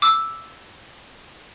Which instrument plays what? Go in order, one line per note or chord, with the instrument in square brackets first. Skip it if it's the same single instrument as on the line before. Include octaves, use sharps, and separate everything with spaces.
[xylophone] D6 E6